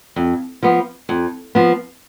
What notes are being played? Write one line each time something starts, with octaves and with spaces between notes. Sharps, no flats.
F2
F3 B3
F2
F3 B3